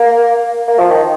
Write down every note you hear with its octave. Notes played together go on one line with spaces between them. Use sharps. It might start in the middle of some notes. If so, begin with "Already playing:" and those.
Already playing: A#3
A#3
F3
D#3